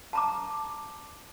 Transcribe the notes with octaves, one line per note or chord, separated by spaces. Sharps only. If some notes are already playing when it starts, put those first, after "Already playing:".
A5 A#5 D6